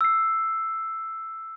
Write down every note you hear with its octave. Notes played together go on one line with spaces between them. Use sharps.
E6 C7